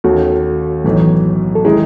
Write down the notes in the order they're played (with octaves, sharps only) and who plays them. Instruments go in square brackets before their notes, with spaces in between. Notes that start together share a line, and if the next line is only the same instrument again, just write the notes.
[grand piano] D#2 D#3 A3 C#4 [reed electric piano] F#4 A4
[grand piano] B1 A2 E3 A3 D#4
[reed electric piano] A4
[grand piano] D#3 G#3 D#4 [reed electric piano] E4 G#4